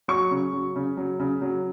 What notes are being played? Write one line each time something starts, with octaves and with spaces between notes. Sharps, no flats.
F#3 C#6
C#3
F#3
C#3
F#3
C#3
F#3